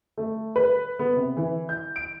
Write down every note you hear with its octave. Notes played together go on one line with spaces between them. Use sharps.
A3
B4
B3
C3
E3
G6
D7